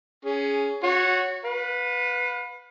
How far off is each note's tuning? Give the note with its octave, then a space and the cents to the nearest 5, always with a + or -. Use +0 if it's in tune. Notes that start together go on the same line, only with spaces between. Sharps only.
C#4 +15 G#4 +0
F#4 -20 C#5 +0 F#5 +0
B4 -5 F5 +40